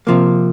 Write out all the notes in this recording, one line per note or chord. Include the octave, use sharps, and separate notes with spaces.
C3 F3 A#3